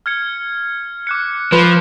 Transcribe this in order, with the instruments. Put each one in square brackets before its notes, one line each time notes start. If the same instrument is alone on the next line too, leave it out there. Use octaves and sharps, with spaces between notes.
[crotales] F6 G#6 C#7
D6 F#6 C#7
[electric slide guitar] F3 [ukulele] B4 [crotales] F#6